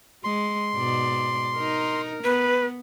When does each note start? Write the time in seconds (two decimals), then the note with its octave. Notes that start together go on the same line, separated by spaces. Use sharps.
0.24 G#3 C6
0.75 G#2 B2 D5
1.56 D#4 A#4
2.24 B3 B4